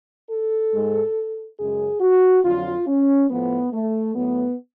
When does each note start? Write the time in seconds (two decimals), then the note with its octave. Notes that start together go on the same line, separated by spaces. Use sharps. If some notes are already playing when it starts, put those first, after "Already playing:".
0.29 A4
0.73 G#2 G#3
1.58 F#2 C#3 G#3 G#4
2.01 F#4
2.44 F2 D3 F#3 F4
2.87 C#4
3.29 A2 F3 A3 B3
3.73 A3
4.15 A2 F#3 A3 B3